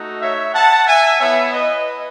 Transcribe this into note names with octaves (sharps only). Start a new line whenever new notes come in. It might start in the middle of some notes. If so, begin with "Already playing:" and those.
Already playing: A3 D#4 F#4
C#5 E5
F#5 A5
E5 G#5
B3 E4 C#5 E5
B4 D#5